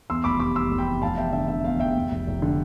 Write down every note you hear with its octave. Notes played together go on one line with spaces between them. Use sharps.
E2 C6 E6
F1 B5 D6
G3 B5 D6
G3 C6 E6
F1
G5 B5
C3
F1 F5 A5
E2 E5 G5
D3 E5
D3 E5
E2 F5
E2 E5 G5
F1
F1
F1
D3